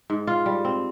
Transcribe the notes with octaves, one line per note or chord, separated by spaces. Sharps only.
G#2
F4
G3
C4